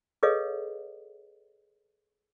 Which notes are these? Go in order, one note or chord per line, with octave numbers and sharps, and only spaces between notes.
G#4 A4 B4 C#5 D#5 F5